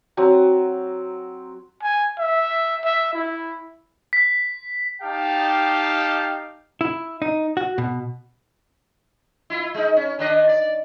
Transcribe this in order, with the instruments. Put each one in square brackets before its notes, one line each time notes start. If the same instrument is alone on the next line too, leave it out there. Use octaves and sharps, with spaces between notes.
[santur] F#3 C4 A#5
[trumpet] G#5
E5
E5
E4
[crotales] B6
[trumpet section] D#4 G4 F5 G5 A5
[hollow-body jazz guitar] E4
D#4
F#4
B2
[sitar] E4 F4
G#3 D#4
C#4
D#3 D4 D#5
D5